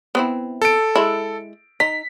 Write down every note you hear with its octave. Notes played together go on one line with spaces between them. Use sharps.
B3 C4 E4
A4 D7
G#3 E4
D#4 B6